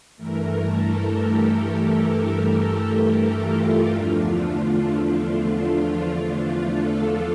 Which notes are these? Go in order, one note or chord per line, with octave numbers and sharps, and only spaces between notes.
G2 E3 A3 A#4
A4
G4
F4
E2 D3 F3 A3 D4 F4
F4
F4
A4